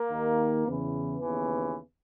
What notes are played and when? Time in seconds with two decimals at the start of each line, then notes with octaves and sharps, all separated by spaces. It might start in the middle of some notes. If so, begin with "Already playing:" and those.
Already playing: A#3
0.11 D#2 D#3
0.67 E2 C#3 E3 B3
1.22 D#2 C#3 E3